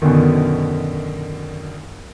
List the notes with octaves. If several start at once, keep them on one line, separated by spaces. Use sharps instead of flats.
F#2 B2 D3 D#3